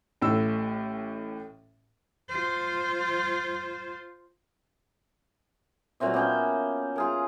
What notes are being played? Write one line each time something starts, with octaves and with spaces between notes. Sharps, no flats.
A1 A2 E6
F4 C5
A#2 F#3 C4 E5
A#3 B3 C#4 G5
F4 G#4 A#4